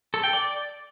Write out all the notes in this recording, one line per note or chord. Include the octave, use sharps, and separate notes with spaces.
A4
G5
D5